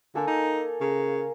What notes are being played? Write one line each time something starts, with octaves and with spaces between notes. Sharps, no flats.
D3 A#3 A4 G#5
D#4
C#3 A#4